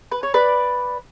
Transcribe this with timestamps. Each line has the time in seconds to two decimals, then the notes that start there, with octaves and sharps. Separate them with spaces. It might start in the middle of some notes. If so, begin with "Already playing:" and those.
0.12 B4
0.23 C#5
0.34 B4 D5